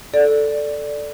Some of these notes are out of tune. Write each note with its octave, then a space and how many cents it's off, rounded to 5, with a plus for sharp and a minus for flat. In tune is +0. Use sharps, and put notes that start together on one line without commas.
A4 +0 D5 +0